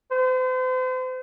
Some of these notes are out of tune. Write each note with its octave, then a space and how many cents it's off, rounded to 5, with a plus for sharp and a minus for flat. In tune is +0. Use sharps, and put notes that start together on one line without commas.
C5 -40